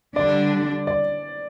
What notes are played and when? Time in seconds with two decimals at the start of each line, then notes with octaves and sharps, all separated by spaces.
0.15 D3 G3 D4 D5
0.87 D5